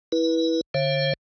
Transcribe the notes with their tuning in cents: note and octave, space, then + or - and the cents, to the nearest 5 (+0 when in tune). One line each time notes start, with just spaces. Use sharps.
E4 -15 B4 -20
D3 +0 C#5 -45 E5 +40